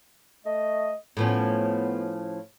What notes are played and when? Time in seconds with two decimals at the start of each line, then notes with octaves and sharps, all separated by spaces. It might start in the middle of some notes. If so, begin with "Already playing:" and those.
0.45 A3 D#5
1.17 A2 F3 B3 C#4